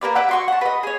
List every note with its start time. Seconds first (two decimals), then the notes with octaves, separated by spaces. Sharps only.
0.01 A#3 A#4 B4 D5
0.15 B4 D5 E5 F#5
0.29 F#4 C6 C#6
0.48 F#5 A5
0.61 B4 D#5
0.83 G#4 C#5